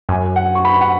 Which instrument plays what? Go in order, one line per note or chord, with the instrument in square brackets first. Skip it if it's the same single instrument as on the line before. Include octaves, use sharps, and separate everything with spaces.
[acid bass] F#2 [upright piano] G#5
[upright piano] F#5
C#6
B5
F#5